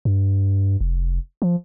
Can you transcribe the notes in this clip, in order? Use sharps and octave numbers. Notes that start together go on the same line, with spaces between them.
G2
F1
F3